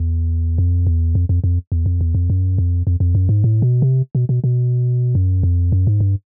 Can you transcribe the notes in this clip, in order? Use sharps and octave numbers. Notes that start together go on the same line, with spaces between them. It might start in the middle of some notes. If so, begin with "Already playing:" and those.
Already playing: E2
F2
E2
F2
F2
F2
E2
F2
E2
F2
F#2
F2
F2
F2
F#2
G#2
A2
B2
C3
B2
B2
B2
F#2
F2
F#2
G#2
G2